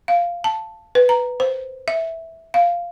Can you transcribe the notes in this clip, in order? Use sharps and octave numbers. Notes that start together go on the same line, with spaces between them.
F5
A5
B4
A#5
C5
E5
F5